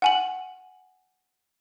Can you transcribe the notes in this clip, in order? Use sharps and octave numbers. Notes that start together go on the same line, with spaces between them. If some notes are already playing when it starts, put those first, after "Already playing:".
F#5 G#5 F#7